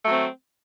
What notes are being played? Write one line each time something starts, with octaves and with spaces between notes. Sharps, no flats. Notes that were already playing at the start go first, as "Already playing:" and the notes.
F#3 A3 C4